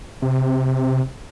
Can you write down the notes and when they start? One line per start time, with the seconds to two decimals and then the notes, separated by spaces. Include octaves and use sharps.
0.22 C3